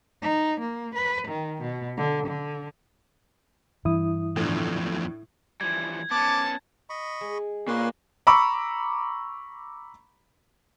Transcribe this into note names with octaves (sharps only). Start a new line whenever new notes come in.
D#4
A#3
B4
D#3
B2
D3
D3
G2 E3 E4 D#6
E2 A2 D3 F3
E3 F3 G3 G#6
B3 C#4 A5 D6
D#5 B5 C#6
G#3
A#2 B4 C#5 C6
A#5 B5 C#6 D6 E6